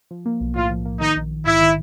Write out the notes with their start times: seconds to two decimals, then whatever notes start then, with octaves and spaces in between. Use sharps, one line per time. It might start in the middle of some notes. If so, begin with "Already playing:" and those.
0.11 F3
0.26 A#3
0.40 B1
0.56 A2 F4
0.70 F3
0.85 A#3
1.01 D#3 D#4
1.16 A#1
1.31 A#1
1.46 G#2 E4
1.61 D#3